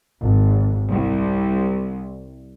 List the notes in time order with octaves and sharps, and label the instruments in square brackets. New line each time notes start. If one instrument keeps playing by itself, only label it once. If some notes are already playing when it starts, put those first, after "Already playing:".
[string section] G#1
C2